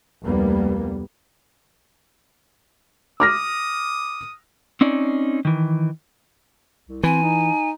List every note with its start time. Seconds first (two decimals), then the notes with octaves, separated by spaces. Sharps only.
0.23 F1 D2 G3 A#3 B3
3.20 D6 D#6 F6 A#6
4.81 C4 C#4 D#4 D5
5.45 D#3 E3
6.89 C2
7.04 E3 C4 G#5
7.22 D#4